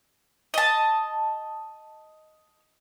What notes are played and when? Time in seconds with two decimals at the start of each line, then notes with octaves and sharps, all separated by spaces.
0.54 D#5 A5